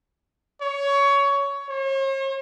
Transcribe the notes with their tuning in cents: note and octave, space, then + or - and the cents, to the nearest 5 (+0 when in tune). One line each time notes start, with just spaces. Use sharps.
C#5 +15
C#5 -45